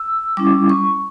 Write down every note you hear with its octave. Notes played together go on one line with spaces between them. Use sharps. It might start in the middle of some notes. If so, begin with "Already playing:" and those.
Already playing: E6
G3 C#4 E4 D6
C#6